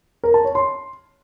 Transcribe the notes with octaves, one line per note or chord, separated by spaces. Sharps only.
A#4
A5
C#5
C6